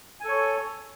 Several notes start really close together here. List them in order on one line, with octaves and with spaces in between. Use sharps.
G#5 A4 C#5